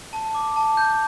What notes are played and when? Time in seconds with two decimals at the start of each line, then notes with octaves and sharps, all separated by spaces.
0.13 A5
0.35 D6
0.56 A5
0.77 G6